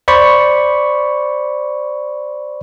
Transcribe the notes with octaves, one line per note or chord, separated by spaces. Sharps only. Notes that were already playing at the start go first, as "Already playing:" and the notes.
C5 D5 B5 C#6